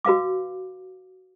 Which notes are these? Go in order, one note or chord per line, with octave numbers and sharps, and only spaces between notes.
F#4 B4 F5 D6